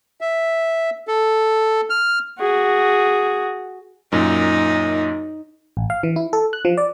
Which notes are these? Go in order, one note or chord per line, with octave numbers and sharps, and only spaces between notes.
E5
A4
F6
F#4 G#4
F#2 A#2 D#4
A1
F5
E3
E4
A4
F#6
F3
D5